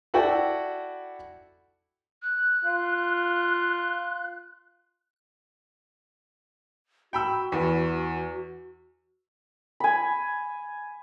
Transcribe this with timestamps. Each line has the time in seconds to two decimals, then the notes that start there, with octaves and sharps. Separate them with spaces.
0.14 E4 F#4 A4 D5 F#5 G5
2.22 F#6
2.64 F4
7.13 F#4 G5 B5 E6
7.52 E2
9.80 G#5 B5